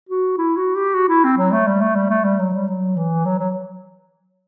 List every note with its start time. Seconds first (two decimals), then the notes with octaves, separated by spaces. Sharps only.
0.09 F#4
0.38 E4
0.57 F#4
0.76 G4
0.94 F#4
1.09 E4
1.24 C4
1.38 F#3
1.53 A3
1.67 G3
1.81 A3
1.96 G3
2.10 A3
2.25 G3
2.39 F#3
2.54 G3
2.68 F#3
2.97 E3
3.26 F#3
3.39 F#3